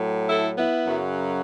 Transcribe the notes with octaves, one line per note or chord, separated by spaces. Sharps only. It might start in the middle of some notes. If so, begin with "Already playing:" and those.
Already playing: A2 F#3
E4 A4
B3 E4
F#2 C#3 F#3